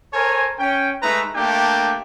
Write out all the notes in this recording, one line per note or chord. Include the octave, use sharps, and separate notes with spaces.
A4 A#4 C5 C#5 G#5
C#4 G5
G#3 A3 D#4 B4 E5 A#5
A3 A#3 D4 G4 G5